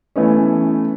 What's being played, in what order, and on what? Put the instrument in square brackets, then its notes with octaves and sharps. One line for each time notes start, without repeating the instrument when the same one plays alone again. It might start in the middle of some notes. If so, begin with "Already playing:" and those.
[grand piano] E3 A3 B3 C#4